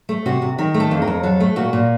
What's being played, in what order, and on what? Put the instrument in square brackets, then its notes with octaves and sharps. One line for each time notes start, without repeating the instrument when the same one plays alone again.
[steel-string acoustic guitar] A3
C3 F#4
C3
D#3 A#4
A3
A4
F2
A#4
F2
F#3 A4
A3
A#2 F#4
A#2